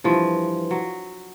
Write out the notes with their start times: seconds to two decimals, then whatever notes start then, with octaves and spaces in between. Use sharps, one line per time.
0.04 G2 E3 F3
0.71 F#3